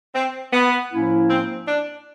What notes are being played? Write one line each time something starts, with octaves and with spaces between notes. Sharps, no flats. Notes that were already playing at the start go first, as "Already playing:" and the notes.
C4
B3
A2 F3 A#3 C#4 E4
C4
D4